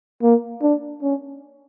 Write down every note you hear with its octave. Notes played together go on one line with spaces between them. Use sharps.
A#3
D4
C#4